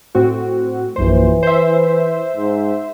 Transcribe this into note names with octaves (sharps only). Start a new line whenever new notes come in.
A2 C4 F#4
A#1 F#2 E3 C5
C5 E5
G#2